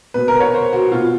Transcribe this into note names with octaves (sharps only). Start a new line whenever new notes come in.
B2 B4
A#4
C#5
C5
F#4
B2 F4